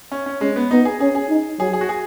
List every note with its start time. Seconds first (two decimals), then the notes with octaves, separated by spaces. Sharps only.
0.12 C#4
0.26 C#4
0.41 G#3 C#4
0.56 B3
0.71 B3 D#4
0.85 G#4
1.00 C#4 G#4
1.15 G#4
1.29 D#4
1.59 F#3 G#4
1.73 G#4
1.81 F#4
1.89 G#4